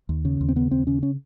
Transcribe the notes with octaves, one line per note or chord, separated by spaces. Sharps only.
D#2
C#3
D#2
C4
C#3 B3
D#2 C4
C#3 C#4
C#4